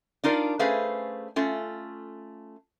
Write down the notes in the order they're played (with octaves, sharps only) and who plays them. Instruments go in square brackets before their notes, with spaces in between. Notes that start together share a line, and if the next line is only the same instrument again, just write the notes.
[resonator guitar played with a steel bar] D4 D#4 F4 A#4 D5
A3 C#4 G#4 B4 C5 F5
A3 C#4 F4